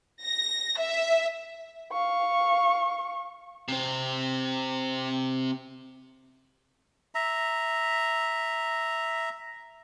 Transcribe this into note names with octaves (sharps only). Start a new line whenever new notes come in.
A#6
E5
F5 C#6
C3 C4
E5 A#5